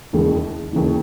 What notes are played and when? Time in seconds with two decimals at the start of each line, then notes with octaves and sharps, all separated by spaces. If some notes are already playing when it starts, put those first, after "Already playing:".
0.13 E1 D#2 C#3 E3 G#3
0.73 E1 D#2 C#3 E3